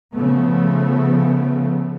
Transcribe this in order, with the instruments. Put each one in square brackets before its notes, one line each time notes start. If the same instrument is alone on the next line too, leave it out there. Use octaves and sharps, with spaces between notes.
[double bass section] C#3 F3 A3 B3